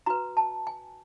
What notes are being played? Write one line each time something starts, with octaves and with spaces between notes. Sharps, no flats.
F#4 B4 A#5
A5
G#5